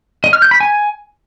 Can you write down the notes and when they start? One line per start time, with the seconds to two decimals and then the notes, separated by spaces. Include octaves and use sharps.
0.24 D#5
0.33 F6
0.42 G6
0.51 B5
0.60 G#5